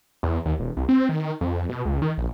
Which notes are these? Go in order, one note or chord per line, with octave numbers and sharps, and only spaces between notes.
E2
D#2
E1
C2
C4
D#3
F2
B2
C#2
D#3
A#1